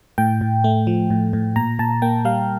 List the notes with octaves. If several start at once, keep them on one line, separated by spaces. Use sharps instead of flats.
A2 G5
A2
A3
F3
A2
A2
A#2 A#5
A#2 A5
A#3 G5
G3 F5